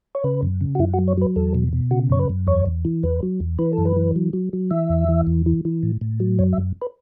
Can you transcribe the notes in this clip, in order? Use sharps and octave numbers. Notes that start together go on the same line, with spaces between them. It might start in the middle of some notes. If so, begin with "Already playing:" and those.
C#5
C#3 B4
F#2
C#3
F#4
F#2 E4
F#4
F#3
C#5
F#3 B4
E2 A4
B2
B2
C#3 F#4
F#2 C#5
B4
F#2
E2 C#5
E2
E3
E2 B4
F#3
E2
E3 B4
A4
F#2
B4
E3
F#3
F#3
F#3
E3 E5
E2
E3
E2
E3
E3
A2
A2
F#3
F#2 C#5
E5
F#2
B4